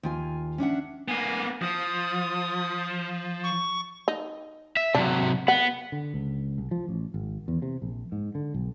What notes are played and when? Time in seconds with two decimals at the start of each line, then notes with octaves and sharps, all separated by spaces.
0.03 D#2 F4 G#5
0.58 C#4 D4 E5 F#5
1.08 A#3 B3 G#5
1.62 F3 D#6
3.44 C#6
4.08 D#4
4.77 E5
4.94 C3 F#3 D4
5.48 B3 F#5
5.92 D3
6.14 C#2
6.58 C2
6.71 F3
6.88 A1
7.14 G#1
7.48 E2
7.62 C3
7.82 A#1
8.12 G#2
8.35 D3
8.54 B1